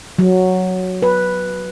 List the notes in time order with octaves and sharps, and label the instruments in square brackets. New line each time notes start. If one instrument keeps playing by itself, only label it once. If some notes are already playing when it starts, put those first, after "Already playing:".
[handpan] F#3
B4